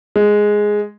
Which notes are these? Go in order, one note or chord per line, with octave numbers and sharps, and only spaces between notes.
G#3